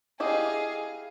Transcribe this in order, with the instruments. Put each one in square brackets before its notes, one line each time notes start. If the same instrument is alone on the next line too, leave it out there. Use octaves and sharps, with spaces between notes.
[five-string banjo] E4 G4 D#5 [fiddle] G#4 F5